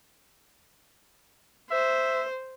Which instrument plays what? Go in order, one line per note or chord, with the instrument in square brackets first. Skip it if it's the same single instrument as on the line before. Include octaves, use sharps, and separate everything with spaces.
[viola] C5 [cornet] E5